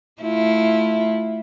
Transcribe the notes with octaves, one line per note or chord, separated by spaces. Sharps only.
A3 E4 F4